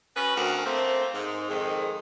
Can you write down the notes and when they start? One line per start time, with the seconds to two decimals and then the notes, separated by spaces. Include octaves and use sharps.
0.16 C#4 F#4 B4
0.37 D2 C4 F#4 A#4
0.66 A3 A#3 C4
1.14 G#2
1.49 F2 D#3 G#3